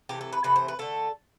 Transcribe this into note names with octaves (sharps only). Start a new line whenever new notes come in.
C3 E3 A3 G4
A4
B4
C3 E3 A3 B4
C5
B4
D3 A3 A4